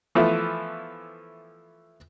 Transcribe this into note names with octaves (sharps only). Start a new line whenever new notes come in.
E3 F3 A3 B3 E4